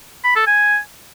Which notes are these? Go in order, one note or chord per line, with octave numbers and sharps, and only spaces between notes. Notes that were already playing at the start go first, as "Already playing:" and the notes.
B5
A4
G#5